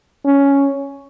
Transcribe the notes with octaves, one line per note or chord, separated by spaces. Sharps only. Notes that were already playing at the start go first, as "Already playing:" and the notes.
C#4